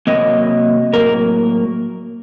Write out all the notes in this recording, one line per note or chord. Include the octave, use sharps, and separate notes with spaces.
C3 F#3 A#3 D#5
A2 F#3 A#3 A#4